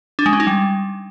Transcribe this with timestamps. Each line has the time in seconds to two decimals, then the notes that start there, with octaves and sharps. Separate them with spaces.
0.19 D4
0.26 G#3
0.33 C#4
0.40 D#4
0.47 G3